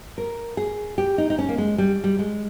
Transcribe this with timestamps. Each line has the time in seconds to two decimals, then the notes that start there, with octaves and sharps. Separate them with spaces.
0.18 A#4
0.57 G#4
0.98 G4
1.18 D#4
1.30 D#4
1.39 C#4
1.49 A#3
1.58 G#3
1.78 G3
2.04 G3
2.19 G#3